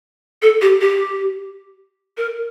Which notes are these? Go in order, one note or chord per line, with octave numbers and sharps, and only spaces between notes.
A4
G4
G4
A#4